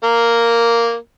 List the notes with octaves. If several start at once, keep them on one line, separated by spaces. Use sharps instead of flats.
A#3 A#4